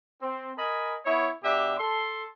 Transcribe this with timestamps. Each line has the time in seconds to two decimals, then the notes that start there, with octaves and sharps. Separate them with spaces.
0.21 C4
0.57 A#4 D#5 G#5 B5
1.05 B3 E4 C#5
1.43 B2 D4 G4 E5
1.79 A4 C6